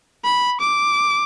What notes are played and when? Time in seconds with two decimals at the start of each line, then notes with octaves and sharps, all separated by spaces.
0.24 B5
0.61 D6